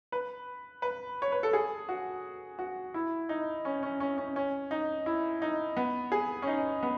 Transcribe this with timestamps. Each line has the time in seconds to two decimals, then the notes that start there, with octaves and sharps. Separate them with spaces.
0.12 B4
0.82 B4
1.22 C#5
1.32 B4
1.43 A4
1.53 G#4
1.89 F#4
2.59 F#4
2.94 E4
3.29 D#4
3.65 C#4
3.83 C#4
4.00 C#4
4.18 C#4
4.36 C#4
4.71 D#4
5.06 E4
5.42 D#4
5.77 B3
6.12 G#4
6.42 C#4
6.47 D#4
6.83 B3